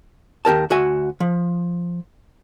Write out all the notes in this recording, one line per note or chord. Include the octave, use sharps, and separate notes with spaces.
D#2 G4 A#4 A5
D2 F#4 E5 G#5
F3